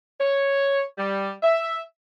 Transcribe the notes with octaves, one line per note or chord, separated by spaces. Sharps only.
C#5
G3
E5